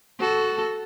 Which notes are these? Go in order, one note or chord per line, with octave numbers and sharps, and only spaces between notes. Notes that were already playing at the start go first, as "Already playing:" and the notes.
F#4 A4